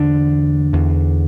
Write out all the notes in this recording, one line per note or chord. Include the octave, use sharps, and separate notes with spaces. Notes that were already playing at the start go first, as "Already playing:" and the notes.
Already playing: E2 D3 D4
E2 D3